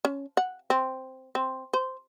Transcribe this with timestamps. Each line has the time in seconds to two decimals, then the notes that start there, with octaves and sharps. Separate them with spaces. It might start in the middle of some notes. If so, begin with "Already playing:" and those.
0.05 C#4
0.37 F#5
0.70 C4
1.35 C4
1.74 C5